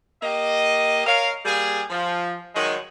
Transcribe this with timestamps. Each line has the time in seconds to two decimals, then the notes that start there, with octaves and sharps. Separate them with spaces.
0.22 A#3 G4 D#5
1.07 A#4 C#5 F5
1.45 G3 A#3 G#4
1.90 F3
2.55 D#3 F#3 G#3